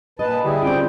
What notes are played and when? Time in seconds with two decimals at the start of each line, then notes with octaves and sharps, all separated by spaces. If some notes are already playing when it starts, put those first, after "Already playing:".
0.19 A#2 B4 D#5 A5
0.45 D3 G3 E4 G#4
0.63 C4 C#4 F4 D5 G5